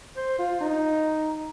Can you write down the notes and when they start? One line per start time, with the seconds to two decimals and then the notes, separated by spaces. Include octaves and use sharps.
0.17 C5
0.39 F4
0.60 D#4